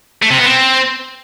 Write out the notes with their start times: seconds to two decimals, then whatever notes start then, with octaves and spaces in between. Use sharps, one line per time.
0.22 A3
0.30 C3
0.38 B3
0.46 C4